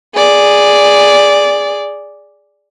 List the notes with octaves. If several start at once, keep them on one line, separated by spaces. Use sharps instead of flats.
G#4 D5